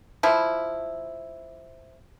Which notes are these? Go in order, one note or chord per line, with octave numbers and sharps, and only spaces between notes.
F3 E4